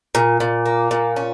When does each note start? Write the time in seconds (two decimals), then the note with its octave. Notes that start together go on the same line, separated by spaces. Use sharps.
0.15 A#2
0.40 A#2
0.66 A#3
0.91 A#2
1.16 C#4